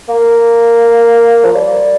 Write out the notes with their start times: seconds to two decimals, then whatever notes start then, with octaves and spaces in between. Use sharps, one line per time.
0.09 A#3
1.45 F3
1.56 G3